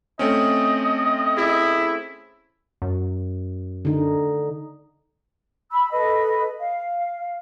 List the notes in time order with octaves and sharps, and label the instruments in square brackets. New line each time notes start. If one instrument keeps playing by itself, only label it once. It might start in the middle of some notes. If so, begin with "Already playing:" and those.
[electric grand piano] A3 C4 C#4 [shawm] D#5
[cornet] E4 [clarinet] G#4
[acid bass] F#2
[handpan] D3 D#4
[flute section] B5 E6
A4 B4 D#5 B5
F5